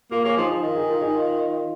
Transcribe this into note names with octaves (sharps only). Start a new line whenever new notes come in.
A#3 F4 A#4
A#3 G#4 C#5
F3 D#4 G#4
F3 D#4 G#4
D#3 F4
D#4 G#4
F4 A#4
D#4 G#4
F4